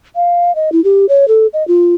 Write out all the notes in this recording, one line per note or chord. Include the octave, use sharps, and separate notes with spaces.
F5
D#5
E4
G4
C#5
A4
D#5
F4